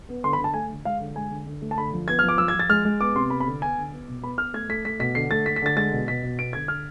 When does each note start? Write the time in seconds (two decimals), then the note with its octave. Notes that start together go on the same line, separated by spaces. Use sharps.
0.09 B3
0.24 D3 C6
0.33 B5
0.38 D3
0.44 A5
0.54 A3 G#5
0.69 D3
0.85 G#3 F5
1.00 D3
1.16 G#3 G#5
1.31 D3
1.46 D3
1.62 A3
1.71 A5
1.77 D3 B5
1.93 F3
2.08 B3 G#6
2.19 F6
2.23 F3
2.28 D6
2.38 F3 E6
2.48 G#6
2.54 F3
2.59 A6
2.69 G#3 F6
2.85 G#3
3.01 B3 D6
3.15 C3 C6
3.30 B3 B5
3.41 B5
3.46 D3
3.62 B3 G#5
3.78 D3
3.92 B3
4.08 B2
4.22 B3 B5
4.38 B3 F6
4.53 A3 G#6
4.69 A3 B6
4.85 A3 B6
4.99 B2 B6
5.15 D3 C7
5.31 A3 A6
5.46 A3 B6
5.56 B6
5.62 D3 A6
5.76 G#3 A6
5.92 B2
6.08 B2 B6
6.23 B2
6.38 B3 D7
6.53 D3 G#6
6.68 D3 F6